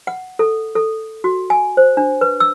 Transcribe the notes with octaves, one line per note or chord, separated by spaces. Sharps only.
F#5
A4
A4
F#4
G#5
C5
D4
B4
E6